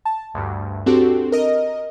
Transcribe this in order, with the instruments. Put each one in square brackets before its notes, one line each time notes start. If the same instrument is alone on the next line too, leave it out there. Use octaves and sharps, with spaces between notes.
[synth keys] A5
D2 G2
C4 D4 F#4 G4 A4
A#4 D#5